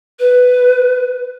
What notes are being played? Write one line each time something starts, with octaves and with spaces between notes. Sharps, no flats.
B4